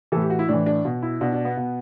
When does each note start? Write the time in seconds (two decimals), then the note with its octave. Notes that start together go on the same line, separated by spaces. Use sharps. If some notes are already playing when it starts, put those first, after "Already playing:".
0.12 E3 A4
0.16 A2
0.21 G4
0.30 F#4
0.39 E4
0.49 A2 E3 D4
0.66 D4
0.85 B2
1.03 E4
1.21 B2 D4
1.33 D4
1.45 B3
1.57 B2